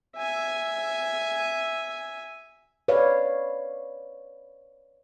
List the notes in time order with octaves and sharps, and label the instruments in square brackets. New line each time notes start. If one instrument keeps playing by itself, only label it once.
[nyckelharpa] E5 G#5
[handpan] B4 C#5 D5 F5